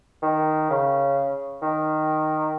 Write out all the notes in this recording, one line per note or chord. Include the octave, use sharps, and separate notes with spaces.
D#3
C#3
D#3